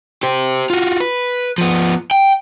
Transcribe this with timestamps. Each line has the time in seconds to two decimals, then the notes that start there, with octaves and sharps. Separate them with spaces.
0.23 G4 C5
0.70 F4 F#4
1.00 B4
1.58 F3 B3
2.11 G5